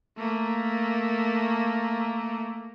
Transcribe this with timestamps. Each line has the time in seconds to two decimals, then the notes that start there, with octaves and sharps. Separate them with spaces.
0.17 A3 A#3